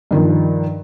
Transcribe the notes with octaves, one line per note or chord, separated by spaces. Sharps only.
G2 D#3 F3